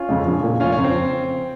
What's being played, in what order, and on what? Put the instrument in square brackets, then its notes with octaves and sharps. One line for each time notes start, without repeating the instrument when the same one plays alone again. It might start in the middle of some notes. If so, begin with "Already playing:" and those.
Already playing: [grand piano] C#4 F4
[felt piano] F2 C#3 G#3
A#1
A#2 F3
[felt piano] F1 [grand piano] C#4 F4
[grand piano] C#4
[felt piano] F2 C#3 F3
[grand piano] C4